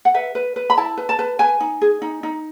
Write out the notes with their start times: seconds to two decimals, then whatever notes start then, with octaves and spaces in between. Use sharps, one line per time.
0.05 F#5
0.14 B4 E5
0.35 B4
0.56 B4
0.70 B5
0.77 E4 A5
0.97 B4
1.09 A5
1.19 B4
1.39 B4 G#5
1.60 D#4
1.81 G#4
2.02 D#4
2.23 D#4